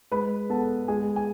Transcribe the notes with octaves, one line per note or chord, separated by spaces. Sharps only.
G#3 B4 B5
B3 A4 A5
G#3 G#4 G#5
G#5